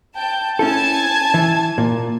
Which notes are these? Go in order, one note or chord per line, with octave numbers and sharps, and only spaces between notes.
G5 A5 G6
C#4 E4 A4 G#5 A5 G#6
E3
A#2